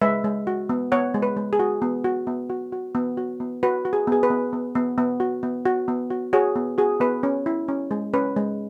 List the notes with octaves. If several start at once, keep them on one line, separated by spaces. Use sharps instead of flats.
G#3 B4 E5
G#3
F#4
B3
B3 C#5 F#5
G#3
B4
G#3
G#4
F#4
B3
F#4
B3
F#4
F#4
B3
F#4
B3
F#4 B4
F#4
G#4
B3 G#4
B4
B3
B3
B3
B3
F#4
B3
F#4
B3
F#4
F#4 G#4 C#5
B3
F#4 G#4
B3 B4
C#4
E4
C#4
G#3
C#4 B4
G#3